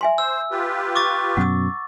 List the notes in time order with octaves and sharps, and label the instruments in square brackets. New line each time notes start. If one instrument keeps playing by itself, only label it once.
[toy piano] E5 G#5 C6
[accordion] C5 [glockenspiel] E6
[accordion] F4 G4 B4
[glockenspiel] C#6 D6 A6
[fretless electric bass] F#2 B2 [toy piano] F#5 D#6